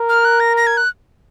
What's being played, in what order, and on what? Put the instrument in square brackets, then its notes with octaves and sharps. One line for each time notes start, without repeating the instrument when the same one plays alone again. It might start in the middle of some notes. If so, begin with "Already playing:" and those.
Already playing: [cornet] A#4
[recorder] F6
F#6
A#6
A#6
G#6
F#6